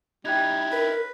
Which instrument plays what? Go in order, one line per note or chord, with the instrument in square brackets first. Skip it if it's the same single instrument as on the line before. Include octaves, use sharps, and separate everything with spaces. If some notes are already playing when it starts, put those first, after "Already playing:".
[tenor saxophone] G3 [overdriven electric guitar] D#4 E4 [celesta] G5 F#6 G#6
[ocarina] A#4 [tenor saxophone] B4